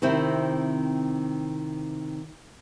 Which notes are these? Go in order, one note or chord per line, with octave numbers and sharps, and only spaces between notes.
C3 D#3 C4 E4